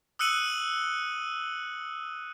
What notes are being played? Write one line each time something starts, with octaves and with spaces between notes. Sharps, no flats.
D#6 E6 F#6 C#7 D#7 F#7